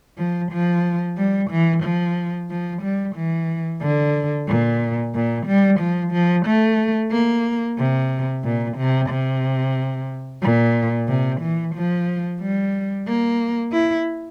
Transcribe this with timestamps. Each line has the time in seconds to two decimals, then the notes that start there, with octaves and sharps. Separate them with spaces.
0.18 F3
0.52 F3
1.18 G3
1.51 E3
1.84 F3
2.50 F3
2.82 G3
3.16 E3
3.82 D3
4.48 A#2
5.15 A#2
5.47 G3
5.80 F3
6.13 F3
6.46 A3
7.12 A#3
7.78 C3
8.44 A#2
8.78 C3
9.10 C3
10.42 A#2
11.09 C3
11.41 E3
11.75 F3
12.41 G3
13.07 A#3
13.72 E4